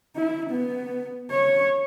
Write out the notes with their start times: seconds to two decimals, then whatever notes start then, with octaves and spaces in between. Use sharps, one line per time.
0.16 E4
0.50 B3
1.31 C#5